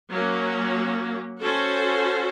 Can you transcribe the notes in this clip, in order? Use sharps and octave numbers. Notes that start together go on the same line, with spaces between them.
F#3 A#3 C#4
C#4 F#4 A4 C5